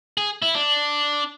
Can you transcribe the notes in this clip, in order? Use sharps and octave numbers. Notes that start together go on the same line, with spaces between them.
G#4
E4
D4